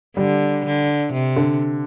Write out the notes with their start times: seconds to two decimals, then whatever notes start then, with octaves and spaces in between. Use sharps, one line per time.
0.17 D3 G3
0.66 D3
1.12 C3
1.36 D3